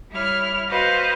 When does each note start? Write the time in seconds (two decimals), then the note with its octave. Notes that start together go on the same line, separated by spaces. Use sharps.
0.11 G3 E4 C#5 F6
0.68 F#4 B4 C5 D#5 F5